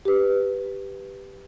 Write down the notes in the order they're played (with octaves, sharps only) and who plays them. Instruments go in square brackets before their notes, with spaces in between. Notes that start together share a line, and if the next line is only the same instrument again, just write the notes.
[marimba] G4 B4